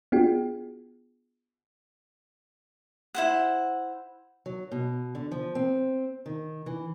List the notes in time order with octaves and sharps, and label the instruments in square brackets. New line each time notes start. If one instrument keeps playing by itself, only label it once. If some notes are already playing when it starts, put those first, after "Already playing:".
[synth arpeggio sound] B3 D4 F4 F#4 G#4 G5
[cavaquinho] E4 C5 F#5
[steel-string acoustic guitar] F#3
B2
D3
F3
C4
D#3
E3